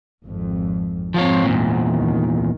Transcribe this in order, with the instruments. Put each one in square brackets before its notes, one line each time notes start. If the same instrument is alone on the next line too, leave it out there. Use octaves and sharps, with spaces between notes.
[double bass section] G#1 F2
[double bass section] G#2 C4 [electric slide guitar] F3 F4 C#5
[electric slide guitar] E2 A#2
[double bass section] C#2 D#3